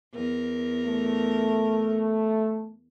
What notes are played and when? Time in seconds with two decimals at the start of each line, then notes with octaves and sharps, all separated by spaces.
0.15 E2 A#4
0.85 A3